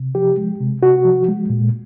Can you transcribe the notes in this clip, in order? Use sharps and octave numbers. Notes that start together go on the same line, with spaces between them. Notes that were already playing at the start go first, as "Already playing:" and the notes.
Already playing: C3
F3 G4
G#3
C3
C3 F#4
F3
G#3
A#2